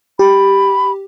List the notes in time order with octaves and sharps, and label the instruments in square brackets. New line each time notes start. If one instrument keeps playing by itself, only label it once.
[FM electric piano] G4 [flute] B5